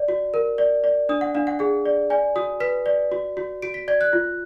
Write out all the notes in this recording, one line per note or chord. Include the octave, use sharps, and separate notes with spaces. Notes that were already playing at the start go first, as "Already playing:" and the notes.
Already playing: D5
F#4
A#4
D5
D5
D4 D#6
F#5
D4 F5
F#5
G#4 F#5
D5
D5 G#5
F#4 D#6
B4 B6
D5
F#4
F#4
F#4 D7
B6
D5 G#6
F#6
F4